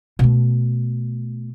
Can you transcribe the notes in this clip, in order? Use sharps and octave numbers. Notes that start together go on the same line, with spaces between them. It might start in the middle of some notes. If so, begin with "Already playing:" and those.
B2 A3